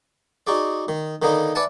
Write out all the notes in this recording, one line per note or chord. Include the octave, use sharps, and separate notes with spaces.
D#4 F#4 G#4 D5
D#3
D3 D#3 A#3 B3 D#4
B4 D5 E5 F#5 G#5 A5